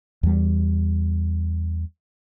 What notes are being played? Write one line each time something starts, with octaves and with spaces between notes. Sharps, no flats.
E2 G3